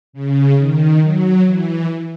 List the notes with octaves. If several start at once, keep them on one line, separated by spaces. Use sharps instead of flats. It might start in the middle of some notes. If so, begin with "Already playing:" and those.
C#3
D#3
F#3
E3